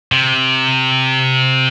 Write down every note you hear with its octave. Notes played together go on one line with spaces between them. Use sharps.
C3